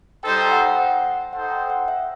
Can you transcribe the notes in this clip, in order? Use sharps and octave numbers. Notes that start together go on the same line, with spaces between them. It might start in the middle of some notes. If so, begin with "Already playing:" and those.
G3 D#4 A4 C5 G5
G5
F#5
G5
F#5
D#4 A4 C5 F#5
G5
F#5
E5